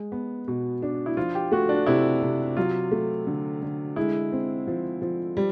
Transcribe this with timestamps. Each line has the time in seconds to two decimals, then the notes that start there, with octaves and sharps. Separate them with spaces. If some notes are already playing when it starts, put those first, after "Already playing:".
Already playing: G#3
0.12 B3
0.48 B2
0.82 D4
1.06 E4
1.17 F3 F4
1.35 G4
1.52 A3 F#4
1.69 D4
1.87 C3 E4
2.23 C3
2.57 F#3 F4
2.91 A3
3.27 D3
3.62 D3
3.96 G#3 E4
4.32 C4
4.67 F3
5.02 F3
5.37 G3